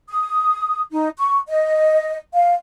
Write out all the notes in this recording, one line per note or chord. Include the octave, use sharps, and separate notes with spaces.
D#6
D#4
C#6
D#5
F5